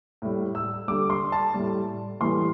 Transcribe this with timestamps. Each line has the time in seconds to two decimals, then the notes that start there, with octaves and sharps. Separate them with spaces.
0.22 A2 G3
0.55 E6
0.88 D3 G3 D6
1.10 C6
1.32 A5
1.54 A2 G3
2.20 A2 E3 G3 C6